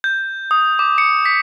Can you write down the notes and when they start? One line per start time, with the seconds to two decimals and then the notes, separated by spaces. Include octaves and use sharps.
0.04 G6
0.51 D#6
0.79 D6
0.98 C#7
1.25 B6